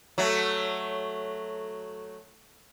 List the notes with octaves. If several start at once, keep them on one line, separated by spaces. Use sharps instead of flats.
F#3 A3